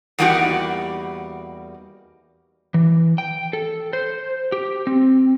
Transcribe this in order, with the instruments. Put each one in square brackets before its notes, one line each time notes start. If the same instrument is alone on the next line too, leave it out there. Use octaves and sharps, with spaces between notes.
[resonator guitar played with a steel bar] E2 G3 A#3 D#4 F#4 G4
[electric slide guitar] E3
G5
A4
C5
G4
C4